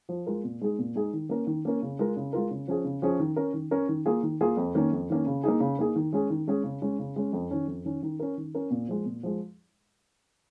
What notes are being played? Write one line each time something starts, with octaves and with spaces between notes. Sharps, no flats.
F3
G#3 F4 A#4
A#2
G#3 D#4 G#4
A#2
G#3 D#4 G#4
D#3
A#3 C#4 A#4
D#3
A#3 C#4 A#4
C#3
G#3 F4 A#4
C#3
G#3 F4 A#4
C#3
F3 C#4 G#4
C#3
F3 C#4 G#4
D#3
C#4 A#4
D#3
C#4 A#4
D#3
A#3 F4 G#4
D#3
A#3 F4 G#4
F2
D#3 A#3 C#4
F2
D#3 A#3 C#4
C#3
A#3 D#4 G#4
C#3
A#3 D#4 G#4
D#3
G#3 C#4 G#4
D#3
G#3 C#4 G#4
C#3
G#3 C#4
C#3
G#3 C#4
F2
D#3 C#4
F2
D#3 C#4
D#3
C#4 A#4
D#3
C#4 A#4
A#2
F3 G#3
A#2
F3 G#3